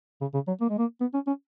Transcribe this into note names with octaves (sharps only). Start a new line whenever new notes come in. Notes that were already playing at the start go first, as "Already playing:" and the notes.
C#3
C#3
F#3
A#3
G#3
A#3
B3
C#4
C#4